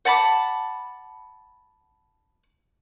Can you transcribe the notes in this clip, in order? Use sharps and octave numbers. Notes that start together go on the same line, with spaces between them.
F#5 A5 B5 D6